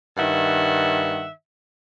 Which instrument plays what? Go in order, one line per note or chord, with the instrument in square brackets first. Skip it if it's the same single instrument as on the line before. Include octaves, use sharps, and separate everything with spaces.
[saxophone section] G2 D#3 E5 F#5